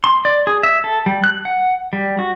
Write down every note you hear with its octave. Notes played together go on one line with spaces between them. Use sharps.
C6
D5
G#4
E5
A4
G3
F#6
F#5
G3
F#4